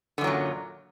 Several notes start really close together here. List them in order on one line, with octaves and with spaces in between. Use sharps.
D3 F#2 F#3 A#2